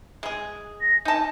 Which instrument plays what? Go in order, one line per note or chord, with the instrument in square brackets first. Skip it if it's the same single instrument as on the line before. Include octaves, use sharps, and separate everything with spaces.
[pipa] G#3 G#4
[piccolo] A#6
[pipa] D#4 A5 [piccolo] G#5